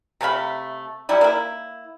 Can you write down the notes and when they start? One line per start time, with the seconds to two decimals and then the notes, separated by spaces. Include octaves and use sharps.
0.21 C3 A3 F5 B5
1.09 F#3 G3 E4
1.21 A#3 E4